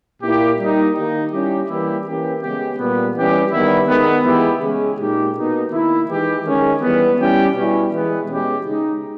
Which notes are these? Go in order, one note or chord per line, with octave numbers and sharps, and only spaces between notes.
A#2 A#3 E4 G4
G3 A#3 D#4 G4
D#3 A#3 D#4
G3 C#4 E4 G4
E3 G3 A#3 E4 G4
E3 A#3 C#4 G4
C#3 G#3 B3 G4
A#2 G3 B3
E3 G3 C#4 G4
D#3 G3 B3 E4
D#3 G#3 B3
E3 G#3 B3 E4 G4
C#3 G#3 C#4
A#2 G#3 D#4 G4
B2 A#3 D#4
D#3 A#3 E4
E3 G#3 D#4 G4
D#3 G#3 C#4
E3 G3 B3
G3 C#4 E4 G4
B2 G3 C#4 E4
E3 G#3 B3
B2 G#3 C#4 G4
C#3 G#3 D#4